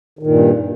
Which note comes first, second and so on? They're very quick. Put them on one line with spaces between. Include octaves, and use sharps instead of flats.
D#3 A#2 G2